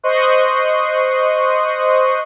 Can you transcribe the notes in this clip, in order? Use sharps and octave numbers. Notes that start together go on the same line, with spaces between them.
C5 D#5 C6 C#6 D#6 F#6